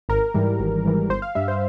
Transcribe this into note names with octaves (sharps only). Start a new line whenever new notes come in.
G#1 A#4
G#2 E3 G3
G#1
G#2 E3 G3
G1 C5
F5
G2 G3 E5
C5